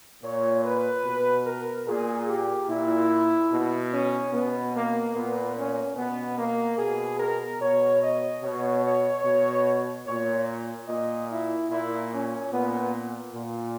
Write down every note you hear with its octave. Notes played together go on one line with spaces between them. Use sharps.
A#2 C#5
B4
B2
A#4
A#2 G#4
G4
A#2 E4
B2
C#4
B2 B3
A#3
A#2 B3
C#4
B2 B3
A#3
B2 G#4
A#4
B2 C#5
D#5
B2 C#5
C#5
B2
A#2 C#5
A#2 D#5
E4
A#2 E4
C#4
A#2 B3
A#2